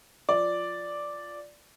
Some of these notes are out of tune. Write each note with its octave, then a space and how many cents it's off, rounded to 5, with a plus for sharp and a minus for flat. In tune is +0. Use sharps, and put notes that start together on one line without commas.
F3 +5 D5 +0